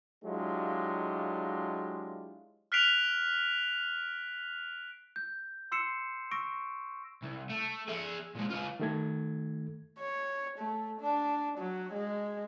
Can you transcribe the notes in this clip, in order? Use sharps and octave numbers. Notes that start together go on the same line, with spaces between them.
F#3 G#3 D4 E4 F4 G4
F6 F#6 B6 C7 D7 F7
G6
C6 E6 C7 C#7 E7
C#6 E6 A#6 D7
C2
A3
G#4 E5
A#2 G#3
F4 B4
D#3 A3 G#6
C#5
A3
D4
F#3
G#3